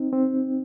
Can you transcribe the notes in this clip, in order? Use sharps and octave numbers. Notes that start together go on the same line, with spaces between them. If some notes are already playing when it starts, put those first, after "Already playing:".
Already playing: C4 D#4
C4